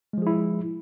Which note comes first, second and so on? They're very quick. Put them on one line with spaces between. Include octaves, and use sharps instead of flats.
G#3 F3 G#4 E4